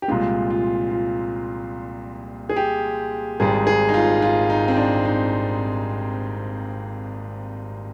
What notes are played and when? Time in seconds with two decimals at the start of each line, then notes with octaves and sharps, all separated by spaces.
0.02 G4
0.08 C2 A#2 F3 G#3 F4
0.50 F4
0.91 F4
2.49 G#4
2.56 G4
3.40 G#1 G#2 G3 G#4
3.67 G#4
3.89 D#4
3.94 F4
4.22 F4
4.50 D#4
4.68 C4
4.77 D4
5.05 D#4